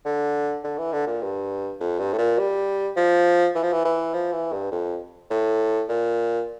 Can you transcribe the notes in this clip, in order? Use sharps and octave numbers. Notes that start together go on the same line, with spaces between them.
D3
D3
E3
D3
A#2
G2
F2
G2
A2
A#2
G3
F3
E3
F3
E3
E3
F3
E3
G2
F2
A2
A#2